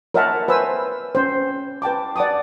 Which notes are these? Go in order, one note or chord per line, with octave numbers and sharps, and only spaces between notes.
A#4 C#5 D#5 E5 F#5 A5
B4 C5 G#5 E6
C#4 C5
B4 G5 A5 D6
D5 F#5 A5 D6 D#6